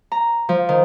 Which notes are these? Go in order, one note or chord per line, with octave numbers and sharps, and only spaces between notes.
A#5
F3
D#3